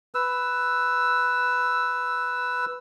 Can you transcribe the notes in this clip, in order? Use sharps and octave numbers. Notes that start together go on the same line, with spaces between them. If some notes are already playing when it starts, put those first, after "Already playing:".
B4 E6